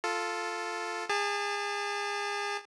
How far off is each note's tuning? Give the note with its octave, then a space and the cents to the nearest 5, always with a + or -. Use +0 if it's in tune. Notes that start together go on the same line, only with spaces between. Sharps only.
F4 +0 A4 +0
G#4 -30 A5 +5